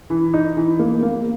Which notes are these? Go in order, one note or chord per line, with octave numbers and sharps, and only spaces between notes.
E3
D#4
E3
A#3
A#3